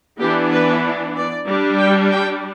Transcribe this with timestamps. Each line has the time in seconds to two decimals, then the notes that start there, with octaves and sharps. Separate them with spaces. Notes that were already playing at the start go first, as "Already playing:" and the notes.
0.19 E3 B3 D4 G4
0.52 B4
1.15 D5
1.47 G3 D4
1.79 G5
2.10 G5